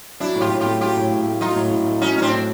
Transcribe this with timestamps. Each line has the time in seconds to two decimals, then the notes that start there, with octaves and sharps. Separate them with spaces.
0.20 F#3 D4 E4
0.35 A2
0.41 F4 G4
0.51 A2
0.61 F4 G4
0.66 A3
0.81 F#3 F4 G4
0.97 A2
1.11 A2
1.27 A3
1.41 F#3 D#4 F4
1.56 A2
1.71 A2
1.87 A3
2.02 F#3 C#4 D#4
2.18 A2 D#4
2.22 C4 D4
2.32 A2